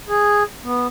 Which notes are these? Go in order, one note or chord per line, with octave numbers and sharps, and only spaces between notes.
G#4
B3